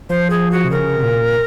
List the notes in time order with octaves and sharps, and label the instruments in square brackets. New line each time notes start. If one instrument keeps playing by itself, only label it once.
[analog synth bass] F3 [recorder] C5
[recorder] G#4
F#4
[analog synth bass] C3
[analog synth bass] C#3 [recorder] A#4
[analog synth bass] C3
A#2